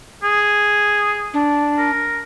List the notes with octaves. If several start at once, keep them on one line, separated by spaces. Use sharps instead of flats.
G#4
D4
A#4